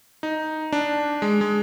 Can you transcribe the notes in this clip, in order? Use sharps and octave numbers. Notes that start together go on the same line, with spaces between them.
D#4
D4
G#3
G#3